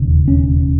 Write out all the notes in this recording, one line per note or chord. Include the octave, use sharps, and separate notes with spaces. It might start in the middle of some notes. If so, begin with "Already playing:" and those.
Already playing: E1 D#2 C#3
C#4